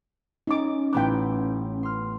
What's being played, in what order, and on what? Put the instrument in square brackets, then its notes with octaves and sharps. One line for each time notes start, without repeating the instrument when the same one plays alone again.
[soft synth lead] C#4 [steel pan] D#4 D6
[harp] A1 B3 F#6 [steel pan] G5 B5 D6
[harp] C6 F6